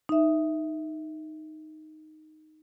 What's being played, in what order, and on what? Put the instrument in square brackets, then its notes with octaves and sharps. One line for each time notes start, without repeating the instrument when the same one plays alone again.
[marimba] D#4 E5